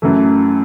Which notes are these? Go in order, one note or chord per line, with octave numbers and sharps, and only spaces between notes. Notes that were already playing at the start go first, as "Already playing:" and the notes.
F#2 E3 A3